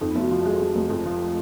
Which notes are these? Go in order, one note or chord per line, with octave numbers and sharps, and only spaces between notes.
F2 D#4
B3
F1
F#4
F3
G#3
G#3
F1
F2 F4
F3